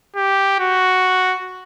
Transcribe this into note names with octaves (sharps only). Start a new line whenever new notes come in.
G4
F#4